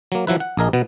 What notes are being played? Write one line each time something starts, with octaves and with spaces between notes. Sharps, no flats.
F#3 A#3
F3 F#3 E4 B4
F#5
A#1 G#4 A#4 D#5
B2 B3